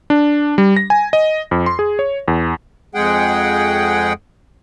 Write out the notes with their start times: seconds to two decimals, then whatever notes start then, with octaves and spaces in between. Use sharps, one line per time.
0.10 D4
0.58 G3
0.76 A#6
0.90 G#5
1.13 D#5
1.51 F2
1.66 C6
1.79 G#4
1.99 C#5
2.28 E2
2.94 F2 G#3 G#4 F#5 G5